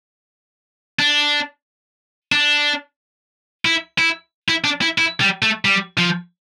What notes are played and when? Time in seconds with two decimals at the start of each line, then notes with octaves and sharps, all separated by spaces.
0.99 D4
2.32 D4
3.65 E4
3.99 E4
4.49 E4
4.64 D4
4.82 E4
4.98 E4
5.21 G3
5.42 A3
5.65 G3
5.98 F3